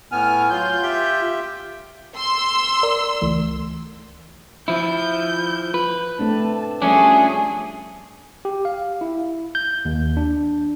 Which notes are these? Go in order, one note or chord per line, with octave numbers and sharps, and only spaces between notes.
A2 B3 G#5 F6
F#3 F4 G6
G4 E5 G5
C6 E6
A#4 D5
C#2 E3 A3
F3 E4 G6
B4
A3 C4 D4 A5
F3 G3 A3 C#4 D4 G#4
G4
F5
E4
G6
D#2
D4